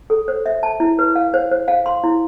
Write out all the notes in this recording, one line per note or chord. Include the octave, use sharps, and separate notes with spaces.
A4
C5
E5
A5
E4
B4
F5
C5
C5
F5
C6
E4